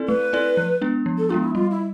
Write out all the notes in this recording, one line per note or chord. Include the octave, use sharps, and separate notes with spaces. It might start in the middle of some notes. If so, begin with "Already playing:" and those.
Already playing: C4 E4 A4 D5
A3 B4
C4 E4 A4 D5
F3
G#3 B3 D4
F3
A4
G#3 B3 D4 F4
E4
G3 F4
E4